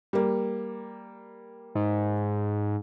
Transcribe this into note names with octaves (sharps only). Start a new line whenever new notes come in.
G3 A#3
G#2